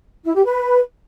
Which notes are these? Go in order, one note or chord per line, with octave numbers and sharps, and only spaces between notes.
E4
G4
B4